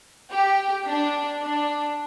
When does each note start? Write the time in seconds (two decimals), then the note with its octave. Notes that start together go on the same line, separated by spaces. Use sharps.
0.31 G4
0.87 D4
1.42 D4